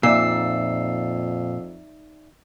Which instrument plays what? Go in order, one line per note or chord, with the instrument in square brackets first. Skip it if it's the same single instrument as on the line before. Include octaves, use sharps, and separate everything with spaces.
[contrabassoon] F2 [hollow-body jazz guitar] A#2 [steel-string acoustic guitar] D#4 D5 E5 [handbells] E6 C7